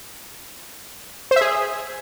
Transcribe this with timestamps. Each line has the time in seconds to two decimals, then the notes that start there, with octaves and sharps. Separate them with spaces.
1.31 C5
1.36 E5
1.41 G#4